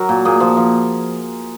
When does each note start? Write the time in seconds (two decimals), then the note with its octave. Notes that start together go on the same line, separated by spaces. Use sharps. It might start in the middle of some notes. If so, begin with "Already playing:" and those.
Already playing: F#3 A#4
0.09 A#2
0.25 A#2 G#4
0.40 F3
0.57 F3